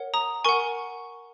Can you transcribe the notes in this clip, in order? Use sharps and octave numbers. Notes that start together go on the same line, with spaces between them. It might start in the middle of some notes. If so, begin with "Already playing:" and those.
Already playing: A#4 C#5 F#5
A#5 D#6
A#4 F#5 G#5 C#6